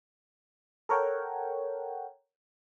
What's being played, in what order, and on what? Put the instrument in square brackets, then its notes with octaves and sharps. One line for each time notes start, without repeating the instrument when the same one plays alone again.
[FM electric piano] A4 A#4 C#5 F#5 G5